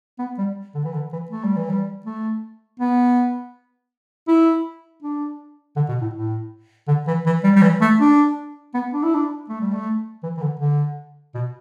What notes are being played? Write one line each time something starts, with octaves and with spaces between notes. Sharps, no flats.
B3
G3
D3
E3
D3
E3
A3
G3
E3
G3
A3
B3
E4
D4
D3
B2
A2
A2
D3
E3
E3
G3
G3
E3
A3
D4
B3
D4
E4
D4
A3
G3
A3
E3
E3
D3
D3
B2